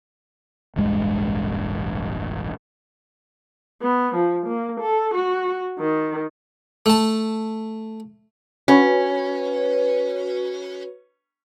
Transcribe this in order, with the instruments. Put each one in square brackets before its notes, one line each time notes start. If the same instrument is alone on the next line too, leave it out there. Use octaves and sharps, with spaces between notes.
[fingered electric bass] E1 A1 G2 G#3
[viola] B3
F3
A#3
A4
F#4
D#3
[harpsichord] A3 A5
[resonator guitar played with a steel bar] C#4 [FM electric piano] F#4 B4 C#5